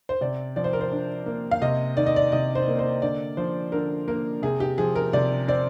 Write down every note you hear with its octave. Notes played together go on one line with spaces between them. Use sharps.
C5
C3 D5
F3 D5
C5
A#4
C5
D4
A#3
F5
C3 D#5
D#3 D5
D#5
D5
C3 D#5
C5
A#3
C5
D3 D5
F3 C5
D3 A#4
A#3 A#4
C3 G#4
G4
F3 G#4
A#4
C3 D5
C4 D5